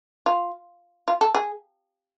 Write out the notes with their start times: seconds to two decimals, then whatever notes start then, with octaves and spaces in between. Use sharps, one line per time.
0.26 F4
1.08 F4
1.21 A4
1.35 G#4